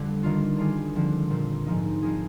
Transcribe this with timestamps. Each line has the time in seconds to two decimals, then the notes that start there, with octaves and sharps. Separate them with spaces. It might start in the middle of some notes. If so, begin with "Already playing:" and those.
Already playing: F2 D3 G3
0.23 D#3 A#3 D4 F4
0.57 D#3 G3 D4 F4 G#4
0.95 D3 F3 C4
1.30 A#2 F3 C4
1.66 G#2 F3 A#3 D#4
2.02 F3 C4 D#4 G#4